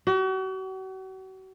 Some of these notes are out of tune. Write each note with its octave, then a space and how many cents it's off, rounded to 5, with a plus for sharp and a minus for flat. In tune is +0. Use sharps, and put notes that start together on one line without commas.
F#4 +40